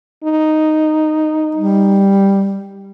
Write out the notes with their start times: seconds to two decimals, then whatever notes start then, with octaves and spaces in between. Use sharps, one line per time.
0.24 D#4
1.55 G3